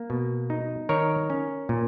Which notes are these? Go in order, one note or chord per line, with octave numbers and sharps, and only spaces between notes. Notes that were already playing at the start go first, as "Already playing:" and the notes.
Already playing: A#3
B2
D#4
D#3 A#4 C#5
C#4
A#2